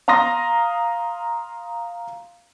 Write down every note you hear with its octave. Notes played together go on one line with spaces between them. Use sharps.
F5 A#5 C6 D#6 A#6